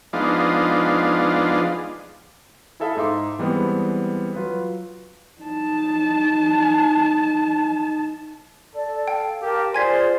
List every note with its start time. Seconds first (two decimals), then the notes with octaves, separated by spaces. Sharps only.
0.13 F3 G#3 B3 D4 D#4 F4
2.80 E4 G#4 A4 E5 F5 B5
2.97 G#2 D#4 E5 C6 D6
3.39 E3 G3 G#3 B3 C4
4.35 F#3 F4 B4
5.41 D#4 A5
8.75 A4 D5
9.08 F5 G5
9.42 G4 A#4 F5 A5
9.74 F4 G#4 C5 D5 G#5 G#6 B6